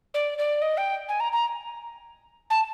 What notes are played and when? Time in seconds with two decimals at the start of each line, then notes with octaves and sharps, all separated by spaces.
0.14 D5
0.38 D5
0.62 D#5
0.77 G5
1.08 G#5
1.20 A#5
1.33 A#5
2.50 A5